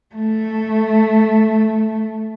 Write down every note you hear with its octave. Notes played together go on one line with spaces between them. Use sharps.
A3